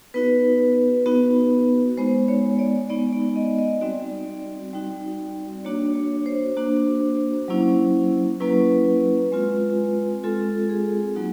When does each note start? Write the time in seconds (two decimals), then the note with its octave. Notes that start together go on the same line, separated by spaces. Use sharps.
0.14 B3 D#4 F#4 B4
1.06 B3 D#4 F#4
1.97 G#3 B3 D#4 C5
2.28 C#5
2.59 D5
2.90 G#3 B3 D#4 D5
3.13 D5
3.36 D#5
3.59 D#5
3.81 G3 C4 D#4 F#4 D5
4.73 G3 C4 D#4 F#4
5.65 A#3 D4 F#4 C#5
5.96 C#5
6.26 C5
6.57 A#3 D4 F#4
7.48 F#3 A#3 C#4 E4
8.40 F#3 A#3 C#4 E4 B4
9.32 G#3 C4 F4
10.24 G#3 C4 F4 A4
10.70 G#4
11.15 F#3 A#3 D#4 F#4